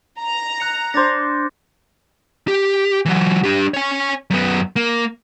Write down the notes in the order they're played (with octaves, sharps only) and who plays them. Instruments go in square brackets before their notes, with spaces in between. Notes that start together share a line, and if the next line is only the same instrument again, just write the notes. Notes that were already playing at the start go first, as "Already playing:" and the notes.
[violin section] A#5
[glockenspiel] F#6 C#7
[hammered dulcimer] D4 C5 [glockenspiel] D6 A6 A#6
[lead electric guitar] G4
E3 F#3
D4 G4
C#5 G#5
F#2 B3
A#3